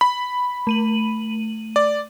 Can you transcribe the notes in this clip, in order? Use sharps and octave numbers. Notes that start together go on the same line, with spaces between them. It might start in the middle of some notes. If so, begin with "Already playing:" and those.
B5
A3 D#7 F#7
D5